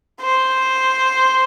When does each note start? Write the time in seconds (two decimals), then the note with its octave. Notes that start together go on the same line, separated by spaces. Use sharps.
0.21 C5